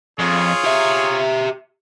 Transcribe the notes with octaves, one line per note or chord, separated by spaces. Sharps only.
F2 F4 G#4 C#5
G4 E5